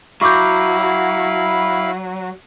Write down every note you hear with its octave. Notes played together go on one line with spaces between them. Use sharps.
F#3 E4 F5 B5 C#6 D6 G6